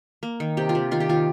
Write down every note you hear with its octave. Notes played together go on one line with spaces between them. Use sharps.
A#3
D#3
C3 G4
F4
C3
D#3 F4
G4
D#3 F4